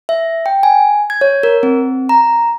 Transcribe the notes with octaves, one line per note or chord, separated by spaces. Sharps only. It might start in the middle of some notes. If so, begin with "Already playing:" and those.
E5
G5
G#5
G#6
C#5
A#4
C4
A#5